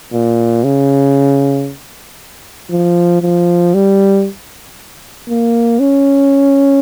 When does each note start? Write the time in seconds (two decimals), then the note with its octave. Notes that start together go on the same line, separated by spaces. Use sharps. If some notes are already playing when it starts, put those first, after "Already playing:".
0.12 A#2
0.64 C#3
2.70 F3
3.22 F3
3.74 G3
5.29 A#3
5.80 C#4